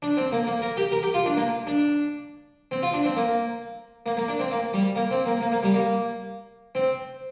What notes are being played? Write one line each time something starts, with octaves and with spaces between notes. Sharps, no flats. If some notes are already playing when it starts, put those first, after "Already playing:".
D4
C4
A#3
A#3
A#4
G4
A#4
G4
F4
D4
A#3
D4
C4
F4
D4
C4
A#3
A#3
A#3
D4
C4
A#3
G3
A#3
C4
A#3
A#3
A#3
G3
A#3
C4